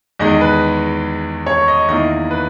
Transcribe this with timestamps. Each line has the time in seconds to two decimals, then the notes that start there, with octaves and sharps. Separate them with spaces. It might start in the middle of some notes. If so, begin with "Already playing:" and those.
0.19 E2 D#3 G#3 D#5
0.41 B4
1.47 C#5
1.68 D#5
1.88 E2 D#3 A#3 E4 D#5
2.31 B4